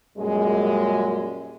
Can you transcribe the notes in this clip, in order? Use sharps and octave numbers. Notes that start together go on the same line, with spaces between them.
F#2 A#2 G3 G#3